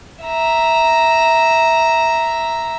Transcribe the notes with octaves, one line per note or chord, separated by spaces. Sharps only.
E5 A#5